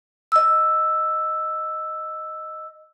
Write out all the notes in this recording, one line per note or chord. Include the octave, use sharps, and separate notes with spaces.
D#5 E6